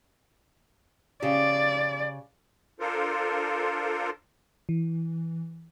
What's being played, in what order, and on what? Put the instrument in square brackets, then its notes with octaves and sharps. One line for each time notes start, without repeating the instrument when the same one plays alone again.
[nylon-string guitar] C#3 G4 [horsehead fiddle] D5
[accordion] D4 F4 A4 A#4 C5
[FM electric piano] E3